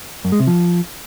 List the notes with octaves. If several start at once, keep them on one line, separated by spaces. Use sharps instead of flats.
F#2
G#3
C3
F3